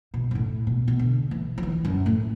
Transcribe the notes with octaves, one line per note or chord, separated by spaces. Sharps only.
B2
F#2
A2
B2
B2
D3
E3
F#3
E3
F#2
A2